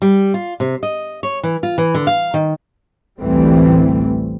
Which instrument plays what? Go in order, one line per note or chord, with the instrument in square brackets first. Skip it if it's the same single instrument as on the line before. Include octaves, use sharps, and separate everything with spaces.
[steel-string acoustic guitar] G3
F4
C3
D#5
C#5
E3
F4
E3
D3
F5
D#3
[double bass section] A1 D2 E3 G3 A3 C4